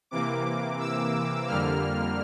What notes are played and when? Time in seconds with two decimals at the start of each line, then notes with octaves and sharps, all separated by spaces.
0.11 C3 E3 A#3 D6
0.79 E6
1.48 F2 D3 G3 A#3 F6